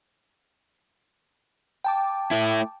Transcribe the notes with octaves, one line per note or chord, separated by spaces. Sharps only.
G5 A5 D6
A3 E4